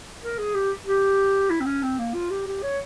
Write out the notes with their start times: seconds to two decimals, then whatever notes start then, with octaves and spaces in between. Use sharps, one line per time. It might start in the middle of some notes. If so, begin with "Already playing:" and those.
0.22 A#4
0.38 G#4
0.54 G4
0.86 G4
1.50 E4
1.60 C4
1.66 C#4
1.83 C4
1.99 A#3
2.14 F4
2.31 G4
2.47 G4
2.62 C#5